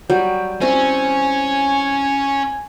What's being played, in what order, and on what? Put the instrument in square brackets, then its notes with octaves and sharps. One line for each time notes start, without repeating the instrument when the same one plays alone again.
[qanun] F#3 G3 [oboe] G5
[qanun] C4 E4 [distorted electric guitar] C#4 [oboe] G#5